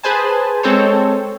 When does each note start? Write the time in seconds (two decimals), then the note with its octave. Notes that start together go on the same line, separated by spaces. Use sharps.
0.03 G#4 B4 C5 G#5 A5
0.63 G#3 C4 A4 C5 C#5